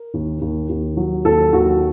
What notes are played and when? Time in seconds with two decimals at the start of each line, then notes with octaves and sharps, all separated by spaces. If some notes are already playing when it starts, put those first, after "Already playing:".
Already playing: A#4
0.14 D#2
0.41 D#2
0.69 D#2
0.97 F#3
1.25 D#2 A4
1.53 D#2 F#4